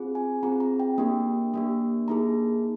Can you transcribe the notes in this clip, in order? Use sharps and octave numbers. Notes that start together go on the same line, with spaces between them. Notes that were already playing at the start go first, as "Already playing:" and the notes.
Already playing: C4 F4 G#4
G#5
C4 F4 G#4 A#5
A#5
G5
A#3 D4 G4 G5
A#3 D4 G4
A#3 D#4 G#4 A#5